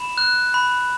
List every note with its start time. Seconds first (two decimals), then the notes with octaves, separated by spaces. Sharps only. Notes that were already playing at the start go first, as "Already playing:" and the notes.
Already playing: B5 E7
0.18 F#6
0.54 B5